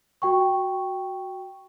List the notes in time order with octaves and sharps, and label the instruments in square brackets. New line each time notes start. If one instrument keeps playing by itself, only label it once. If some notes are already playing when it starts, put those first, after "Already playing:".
[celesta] F#4 G5 C#6